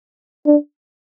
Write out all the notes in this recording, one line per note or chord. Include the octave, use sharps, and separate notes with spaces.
D4